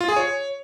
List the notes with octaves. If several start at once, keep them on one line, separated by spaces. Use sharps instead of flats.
F4
G#4
C#5